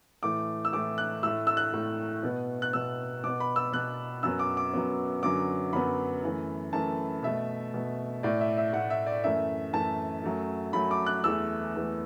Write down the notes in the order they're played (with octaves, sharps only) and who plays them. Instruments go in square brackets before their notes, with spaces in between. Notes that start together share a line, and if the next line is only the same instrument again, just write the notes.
[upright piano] A2 E3 A3 D6
E6
A2 E3 A3 D6
F#6
A2 A3 E6
E6
F#6
A2 A3
B2 B3
F#6
B2 B3 E6
B2 B3 D6
B5
E6
B2 B3 F#6
F#2 F#3 B3 E6
D6
D6
F#2 F#3 B3
F#2 D3 F#3 B3 D6
F#2 D3 F#3 B3 B5
F#2 E3 A3
F#2 E3 A3 A5
B2 A3 E5
B2 A3
A2 A3 D5
E5
E5
A2 A3 F#5
E5
D5
F#2 E3 A3 E5
F#2 E3 A3 A5
F#2 F#3 A3
F#2 F#3 A3 B5
D6
F#6
E2 E3 A3 E6
E2 E3 A3